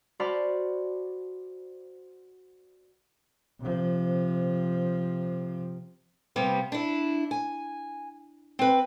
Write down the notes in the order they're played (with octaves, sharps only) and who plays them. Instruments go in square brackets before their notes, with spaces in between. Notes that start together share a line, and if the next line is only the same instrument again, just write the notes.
[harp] F#4 C5 D5 A5 B5 F6
[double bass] C3 F3
[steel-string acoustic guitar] C3 G3 A#3 B3
D4 E4
G#5
C4 B4